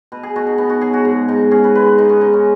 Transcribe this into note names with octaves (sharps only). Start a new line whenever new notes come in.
B2 B4
G#4
B2 F#4
D#4
B3 D#4
F#4
F#3 G#4
F#4
G#2
G#2 D#4
C#4 G#4
B4
G#3 B4
G#4
B3 D#4
C#4
C#3 D#4
C#4